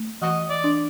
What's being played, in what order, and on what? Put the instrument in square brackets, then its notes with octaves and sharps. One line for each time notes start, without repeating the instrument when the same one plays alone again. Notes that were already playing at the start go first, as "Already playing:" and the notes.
Already playing: [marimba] A3
[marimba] E3 [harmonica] F#4 D#5
[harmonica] D5
[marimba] D4